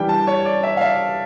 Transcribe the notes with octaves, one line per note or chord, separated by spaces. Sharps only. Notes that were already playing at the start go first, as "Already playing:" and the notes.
Already playing: E3 G3 D4 G5
A5
C#5
D5
E5
F5
E5